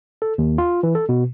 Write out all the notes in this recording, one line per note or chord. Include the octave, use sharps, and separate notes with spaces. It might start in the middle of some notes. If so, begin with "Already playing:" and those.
A4
D#2
F4
E3
A4
B2